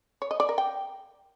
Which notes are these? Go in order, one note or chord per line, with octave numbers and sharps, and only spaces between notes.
C#5
D#5
D5
A#4
G5